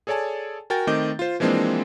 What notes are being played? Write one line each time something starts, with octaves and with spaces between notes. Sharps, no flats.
G#4 A4 C#5 D5 G#5 A5
F#4 A#4 G5 G#5 A6
D#3 A3 C4 D#5 D6 G6
F4 C5
E3 F3 G#3 A#3 C4 D4